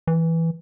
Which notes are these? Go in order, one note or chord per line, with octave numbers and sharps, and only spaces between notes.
E3